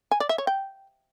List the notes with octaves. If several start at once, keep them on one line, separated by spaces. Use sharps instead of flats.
G#5
D5
E5
C#5
G5